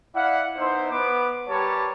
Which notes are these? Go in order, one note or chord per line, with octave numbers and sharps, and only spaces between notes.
E4 D5 F5 F#5
B3 D#4 E4 C5
B3 B4 D6
G3 G4 A#4 B4 C#5 A5